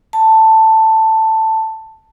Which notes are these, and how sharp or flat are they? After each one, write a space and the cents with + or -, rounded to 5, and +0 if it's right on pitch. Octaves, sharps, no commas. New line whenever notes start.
A5 +10